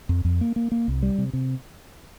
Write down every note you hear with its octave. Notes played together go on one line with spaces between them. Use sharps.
F2
F2
A#3
A#3
A#3
C2
G3
C3
C3